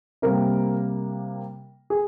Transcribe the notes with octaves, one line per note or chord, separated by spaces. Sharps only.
C3 G3 A#3 A#4
G#4